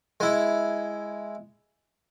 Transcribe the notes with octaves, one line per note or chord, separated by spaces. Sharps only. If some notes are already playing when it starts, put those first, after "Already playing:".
G#3 E4